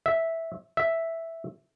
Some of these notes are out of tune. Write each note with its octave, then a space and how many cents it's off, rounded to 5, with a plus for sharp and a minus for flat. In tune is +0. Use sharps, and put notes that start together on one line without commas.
E5 -5
E5 +0